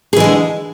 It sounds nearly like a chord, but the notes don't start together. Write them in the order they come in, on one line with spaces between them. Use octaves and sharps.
G#4 E3 G#3 D3